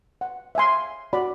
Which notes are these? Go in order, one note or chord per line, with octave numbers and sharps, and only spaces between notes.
F#5
E5 F5 G#5 C6
F#4 D5 B5